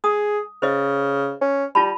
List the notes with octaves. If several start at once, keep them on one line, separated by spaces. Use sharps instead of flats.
G#4 D#6
C#3 C5 D#5
C#4
G3 F4 A5 B5